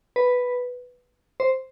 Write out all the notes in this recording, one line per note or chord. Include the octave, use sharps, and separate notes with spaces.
B4
C5